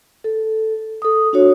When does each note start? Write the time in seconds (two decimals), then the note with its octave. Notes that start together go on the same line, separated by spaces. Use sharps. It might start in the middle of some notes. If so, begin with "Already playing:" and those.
0.24 A4
1.02 A4 D#6
1.33 D4 F#4 C#5